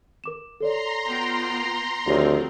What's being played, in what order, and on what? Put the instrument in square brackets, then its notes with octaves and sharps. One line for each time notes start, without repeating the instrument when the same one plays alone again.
[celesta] A#4 D6 E7
[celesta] A4 C#5 D5 [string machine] A#5 C6
[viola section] B3 F4 G5
[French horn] D2 [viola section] D#3 F3 C4 [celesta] F4 G4 C#5